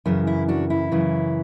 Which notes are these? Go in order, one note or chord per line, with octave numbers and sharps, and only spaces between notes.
F#2 C#3 E3 E4
E4
D4 F#4
E4
F#2 C#3 E3